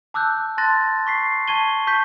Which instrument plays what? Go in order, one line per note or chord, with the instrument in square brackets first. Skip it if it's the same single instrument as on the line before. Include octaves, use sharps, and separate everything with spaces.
[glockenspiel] A5 D6 E6 F#6 G6
A5 C6 F#6 A6 A#6
C#6 B6 C7
A5 C#6 G#6 D#7 G7
A5 C#6 G6 B6